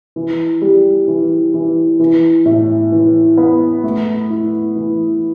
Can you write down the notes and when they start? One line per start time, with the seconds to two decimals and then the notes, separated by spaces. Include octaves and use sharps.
0.16 E3
0.62 G3
1.08 E3
1.54 E3
1.99 E3
2.45 A2
2.92 E3
3.37 B3
3.84 A3
4.30 E4
4.76 E3